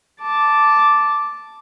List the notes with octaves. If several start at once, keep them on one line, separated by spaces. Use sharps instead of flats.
A5 D6